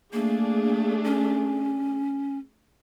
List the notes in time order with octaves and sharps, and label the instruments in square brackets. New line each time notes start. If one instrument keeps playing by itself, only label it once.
[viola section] A3 D4 G#4 [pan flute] A#3
[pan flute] C#4